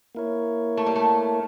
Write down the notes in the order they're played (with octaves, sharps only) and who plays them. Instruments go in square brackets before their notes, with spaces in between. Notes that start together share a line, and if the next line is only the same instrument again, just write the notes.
[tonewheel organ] A#3 E4 A#4 C#5
[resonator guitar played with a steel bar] A3
G3
A3